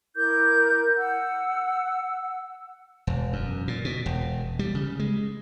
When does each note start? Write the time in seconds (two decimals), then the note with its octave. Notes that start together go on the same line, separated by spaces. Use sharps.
0.16 E4 A#4 D6 G6
0.98 F#5 E6
3.07 E1
3.33 F#2
3.68 A#2
3.85 B2
4.06 E1
4.59 G3
4.75 C#3
4.99 G#3